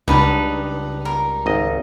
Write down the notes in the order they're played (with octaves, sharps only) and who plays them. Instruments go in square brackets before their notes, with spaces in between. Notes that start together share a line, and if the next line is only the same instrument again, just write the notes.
[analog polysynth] C#2 [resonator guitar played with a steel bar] G3 D4 D#4 [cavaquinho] B4
[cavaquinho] A#4
[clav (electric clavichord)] G#1 D#5